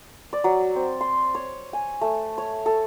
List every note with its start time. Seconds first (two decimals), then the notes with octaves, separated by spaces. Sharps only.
0.33 D5
0.44 F#3
0.76 C4
1.01 C6
1.35 C#5
1.73 G#5
2.01 A3
2.38 C#5
2.66 A4